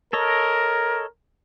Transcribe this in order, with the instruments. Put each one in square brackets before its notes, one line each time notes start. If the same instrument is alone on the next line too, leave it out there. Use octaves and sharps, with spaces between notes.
[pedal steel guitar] A4 C#5 D#5 [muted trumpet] A#4